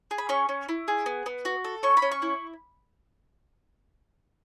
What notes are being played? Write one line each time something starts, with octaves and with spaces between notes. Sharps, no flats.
G#4
B5
C#4 C#6
C#4
E4
G#4
B3
B3
F#4
A4
C#4 C#6
B5
C#4
C#6
E4